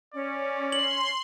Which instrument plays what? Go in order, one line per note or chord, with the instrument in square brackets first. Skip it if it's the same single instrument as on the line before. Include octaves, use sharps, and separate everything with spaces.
[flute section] C#4 [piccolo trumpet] D5
[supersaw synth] C6 [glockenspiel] F#7